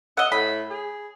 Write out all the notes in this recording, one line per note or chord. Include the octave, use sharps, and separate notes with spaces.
D#5 E5 F#5
A2 B5
G#4